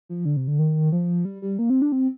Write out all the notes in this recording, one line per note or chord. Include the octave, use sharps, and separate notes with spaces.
F3
D3
C3
D3
D#3
F3
G3
G3
A#3
C4
D4
C4